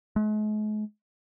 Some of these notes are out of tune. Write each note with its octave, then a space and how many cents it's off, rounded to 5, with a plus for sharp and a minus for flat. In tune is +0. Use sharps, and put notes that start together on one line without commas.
G#3 +45